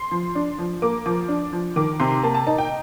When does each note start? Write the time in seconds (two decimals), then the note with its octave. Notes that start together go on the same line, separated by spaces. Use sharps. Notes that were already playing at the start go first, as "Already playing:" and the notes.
Already playing: C6
0.11 F3
0.35 D4
0.59 F3
0.82 A#3 D6
1.06 F3 D6
1.28 D4
1.53 F3
1.76 D#3 D6
2.00 C3 C6
2.23 A#3 A5
2.35 A5
2.47 D#4 A5
2.58 G5